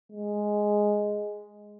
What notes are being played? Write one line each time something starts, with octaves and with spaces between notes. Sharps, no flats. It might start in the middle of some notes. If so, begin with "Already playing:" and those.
G#3